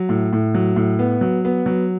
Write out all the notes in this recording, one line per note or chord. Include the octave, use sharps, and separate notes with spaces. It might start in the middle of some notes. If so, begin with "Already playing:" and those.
Already playing: F#3
A2
A2
F#3
A2
B3
F#3
B3
F#3